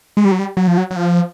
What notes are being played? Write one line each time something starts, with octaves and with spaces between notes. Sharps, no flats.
G#3
G3
F#3
G3
F#3
F3
F#3
F#3
F3